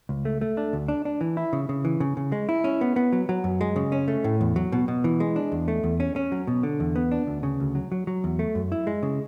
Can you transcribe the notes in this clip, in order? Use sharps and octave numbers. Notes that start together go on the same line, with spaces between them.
C#2
A3
A3
D4
D2
D4
D4
E3
E4
C#3
C#3
E3
C#3
C#3
G#3
E4
C#4
B3
B3
F#3
F#3
F#2
G#3
C#3
C#4
A3
A2
E2
F#3
B2
B2
E3
G#3
D4
E2
A3
E2
C#4
C#4
F#3
B2
D3
E2
B3
D4
D2
C#3
D2
F#3
F#3
F#3
E2
A3
F#2
E4
G#3
C#3